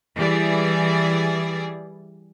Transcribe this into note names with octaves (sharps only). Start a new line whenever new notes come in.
E3 G3 G#4 D5